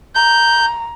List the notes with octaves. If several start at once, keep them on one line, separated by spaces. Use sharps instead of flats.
A#5 G6